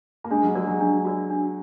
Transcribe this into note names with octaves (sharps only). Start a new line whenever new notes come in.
A#3
G#3 D4
F#3
G#3 F#4 A#4 D5
F#3
D4
F#4 A#4 D5
D4